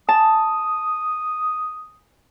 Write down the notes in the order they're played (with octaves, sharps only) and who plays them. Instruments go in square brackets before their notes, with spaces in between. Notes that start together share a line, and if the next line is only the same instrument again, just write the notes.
[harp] A5 [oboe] D#6